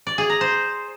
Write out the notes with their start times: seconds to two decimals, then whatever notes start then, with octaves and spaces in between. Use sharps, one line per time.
0.07 D5
0.18 G#4
0.29 A#5
0.41 C5